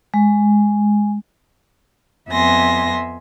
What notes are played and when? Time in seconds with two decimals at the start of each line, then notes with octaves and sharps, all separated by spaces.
0.14 G#3
2.31 F2 B3 E5 G#5 C6 A#6